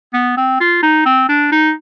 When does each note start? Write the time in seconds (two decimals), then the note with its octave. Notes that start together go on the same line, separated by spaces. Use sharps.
0.13 B3
0.37 C4
0.60 F4
0.82 D#4
1.06 C4
1.29 D4
1.52 D#4